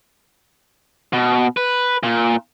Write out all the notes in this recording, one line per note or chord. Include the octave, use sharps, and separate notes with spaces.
B2
B4
A#2